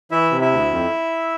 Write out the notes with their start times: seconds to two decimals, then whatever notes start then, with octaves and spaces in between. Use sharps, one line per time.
0.11 E3 E4 E5
0.31 C3
0.41 E4 E5
0.51 D2
0.71 F2